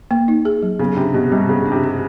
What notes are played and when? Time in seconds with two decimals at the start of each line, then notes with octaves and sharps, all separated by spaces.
0.11 A#3
0.28 D#4
0.45 G#4
0.63 F#3
0.79 C#3 B3
0.96 C3 D4
1.14 B2 G4
1.31 C3 G3
1.49 C#3 B3
1.66 D4
1.72 C3
1.84 G4